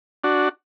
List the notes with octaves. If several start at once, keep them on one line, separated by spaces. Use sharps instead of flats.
D4 F#4